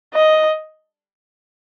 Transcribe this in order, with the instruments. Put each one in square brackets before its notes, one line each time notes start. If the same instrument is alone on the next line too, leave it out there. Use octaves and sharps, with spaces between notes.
[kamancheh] D#5